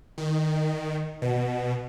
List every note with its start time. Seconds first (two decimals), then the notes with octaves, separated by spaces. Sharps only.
0.18 D#3
1.22 B2